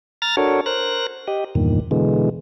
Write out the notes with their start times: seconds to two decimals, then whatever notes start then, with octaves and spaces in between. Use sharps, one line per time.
0.22 A#5 F6 A6 A#6
0.37 D4 F#4 A4 A#4 C#5
0.66 A#4 C5 F#6 A#6
1.28 G4 D#5
1.55 E2 G2 A#2 D#3
1.91 B2 D3 E3 G#3